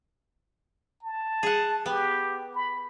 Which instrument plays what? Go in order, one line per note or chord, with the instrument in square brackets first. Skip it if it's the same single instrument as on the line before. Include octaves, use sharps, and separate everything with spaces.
[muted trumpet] A5
[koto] G#4 F#5
[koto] B3 [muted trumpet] G4
[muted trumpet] B5